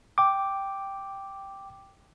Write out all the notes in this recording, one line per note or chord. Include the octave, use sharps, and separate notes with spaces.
G5 D6